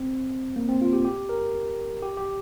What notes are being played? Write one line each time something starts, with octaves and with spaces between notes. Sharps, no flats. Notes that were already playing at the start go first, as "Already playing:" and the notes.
Already playing: C4
A#3
C4
F4
G4
G4
A#4
G4
G4